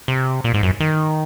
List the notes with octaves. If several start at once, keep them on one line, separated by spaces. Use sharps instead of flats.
C3
A#2
G#2
F#2
D#3